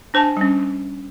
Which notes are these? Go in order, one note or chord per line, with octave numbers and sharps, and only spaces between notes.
D4 C5 G#5 A5
G3 C#4